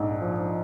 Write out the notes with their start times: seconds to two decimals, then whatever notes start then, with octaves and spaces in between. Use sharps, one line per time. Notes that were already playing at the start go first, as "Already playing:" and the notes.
Already playing: A#1 G#2
0.21 F3